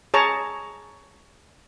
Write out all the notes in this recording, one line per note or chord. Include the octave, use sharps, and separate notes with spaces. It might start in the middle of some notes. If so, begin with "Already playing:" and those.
G#4 C#5 A5 A#5